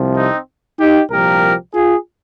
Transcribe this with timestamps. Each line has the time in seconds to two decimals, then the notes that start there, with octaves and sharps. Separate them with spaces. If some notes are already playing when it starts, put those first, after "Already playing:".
Already playing: C2 C3 F3
0.16 C4 D#4
0.79 D#4 G4
1.10 C2 A#2 F3 G4 A#4
1.73 F4 G#4